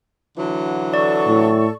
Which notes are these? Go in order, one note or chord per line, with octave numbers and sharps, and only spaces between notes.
D3 E3 F#3
A4 D5 C#6
A2